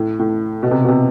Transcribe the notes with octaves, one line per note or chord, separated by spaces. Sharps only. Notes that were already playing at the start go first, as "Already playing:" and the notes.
Already playing: A2
A2
B2
C3
B2
C3